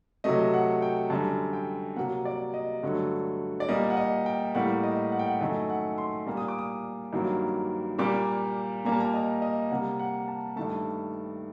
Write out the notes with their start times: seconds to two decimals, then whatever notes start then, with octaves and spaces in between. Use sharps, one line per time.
0.24 C3 F#3 A3 D#5
0.54 F#5
0.82 G5
1.10 F#2 D3 G3 A5
1.53 G5
1.96 C3 F#3 A#3 F#5
2.25 D5
2.54 D#5
2.83 G2 D3 F#3 A3
3.60 D5
3.69 A#2 G3 A#3 D#5
3.90 F#5
3.97 D#5
4.26 G5
4.55 A2 G3 A#3 F#5
4.84 D#5
5.12 F#5
5.19 G5
5.26 F#5
5.41 F#2 D#3 A3 D#5
5.69 F#5
5.98 C6
6.26 A#2 G3 A#3
6.37 D#6
6.48 D6
6.59 D#6
7.13 G2 D#3 F#3 A#3
7.98 A#2 G3 A#3 D6
8.85 A#2 G3 A#3 A#5
8.92 A5
9.00 A#5
9.14 D#5
9.42 D#5
9.70 C3 G3 A#3 F#5
9.99 F#5
10.28 A5
10.56 G2 D#3 A3 A5